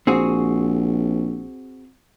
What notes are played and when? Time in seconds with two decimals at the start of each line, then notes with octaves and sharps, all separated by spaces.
0.07 A#1 C4 F#4 G#4